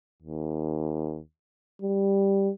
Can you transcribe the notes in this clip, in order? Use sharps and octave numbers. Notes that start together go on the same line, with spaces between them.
D#2
G3